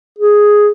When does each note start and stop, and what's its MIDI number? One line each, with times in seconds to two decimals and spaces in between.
0.18 0.70 68